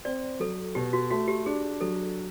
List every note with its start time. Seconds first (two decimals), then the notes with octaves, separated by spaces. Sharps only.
0.05 C4 D5
0.40 F#3 A4
0.75 B2 G4
0.93 F#4
1.10 A3 F#4
1.28 G4
1.46 D4 G#4
1.81 F#3 A4